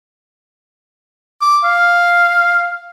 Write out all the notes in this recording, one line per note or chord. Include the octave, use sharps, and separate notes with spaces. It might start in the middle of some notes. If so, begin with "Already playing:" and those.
D6
F5